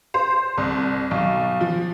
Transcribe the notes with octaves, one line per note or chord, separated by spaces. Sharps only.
C5
C2
B1
F3